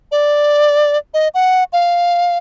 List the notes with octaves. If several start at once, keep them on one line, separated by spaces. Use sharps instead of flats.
D5
D#5
F#5
F5